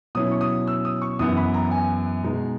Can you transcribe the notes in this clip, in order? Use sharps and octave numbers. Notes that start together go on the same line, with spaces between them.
B2 F#3 C#4 E4 D#6
C#6
D#6
E6
D#6
C#6
F#2 E3 B3 E4 D#6
B5
A#5
G#5
B2 G#3 D#4